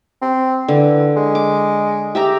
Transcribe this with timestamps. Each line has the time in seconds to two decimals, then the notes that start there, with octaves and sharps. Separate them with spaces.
0.22 C4
0.68 D3 E3
1.17 G#3
1.35 D6
2.15 G4 E5 A#5